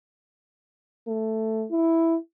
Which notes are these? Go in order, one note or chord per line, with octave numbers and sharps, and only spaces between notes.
A3
E4